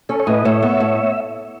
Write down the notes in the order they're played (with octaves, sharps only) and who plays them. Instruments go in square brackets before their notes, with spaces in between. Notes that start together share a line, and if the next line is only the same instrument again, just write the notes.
[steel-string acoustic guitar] C#4 [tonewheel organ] A4 C#5
[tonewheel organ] C#5
[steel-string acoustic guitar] A2 [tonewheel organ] B4 D#5
[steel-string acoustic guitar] A2 [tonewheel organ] C#5 E5
[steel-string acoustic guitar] B3
A2